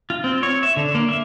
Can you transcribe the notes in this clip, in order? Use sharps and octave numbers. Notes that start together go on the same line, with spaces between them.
F4
C4
C#5
E5
D3
A#3
E5